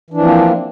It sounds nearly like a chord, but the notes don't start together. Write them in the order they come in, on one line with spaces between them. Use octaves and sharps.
E3 D4 F3 C4 A#3